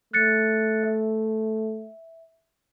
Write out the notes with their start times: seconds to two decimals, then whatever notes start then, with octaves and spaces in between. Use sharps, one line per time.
0.13 A3 F#6 A6 C#7
0.83 E5